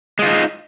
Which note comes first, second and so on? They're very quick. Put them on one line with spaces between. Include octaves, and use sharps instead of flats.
G#3 F4 D#4